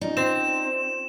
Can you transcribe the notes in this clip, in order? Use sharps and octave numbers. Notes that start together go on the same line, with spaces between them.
C#4 D#4 F4 D5
C4 E7